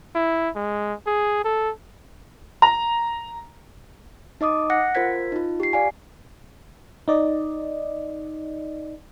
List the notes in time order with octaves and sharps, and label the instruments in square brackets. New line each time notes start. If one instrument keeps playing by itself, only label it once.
[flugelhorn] E4
G#3
G#4
A4
[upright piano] A#5
[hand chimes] D#4 D#5 D6 D#6
F#5 F#6 A#6 C#7
F4 A#4 C5 G#6 B6
D#4 F4
G4 C7
D5 F5 G#5
[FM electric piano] D#4 D5 D#5